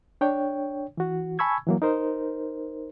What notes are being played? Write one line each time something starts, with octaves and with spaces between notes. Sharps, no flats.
D4 C#5 G5
E3 F#4
G#5 A5 B5 C#6 E6 G#6
E3 F#3 A#3
D#4 A#4 C5